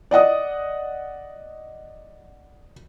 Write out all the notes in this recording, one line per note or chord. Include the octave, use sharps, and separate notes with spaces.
D5 D#5 F#5 D#6